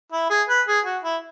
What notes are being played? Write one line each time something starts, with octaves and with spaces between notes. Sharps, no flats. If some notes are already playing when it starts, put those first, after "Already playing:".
E4
G#4
B4
G#4
F#4
E4